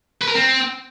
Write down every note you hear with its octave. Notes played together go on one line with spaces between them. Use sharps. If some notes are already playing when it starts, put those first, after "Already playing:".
B4
A#4
C4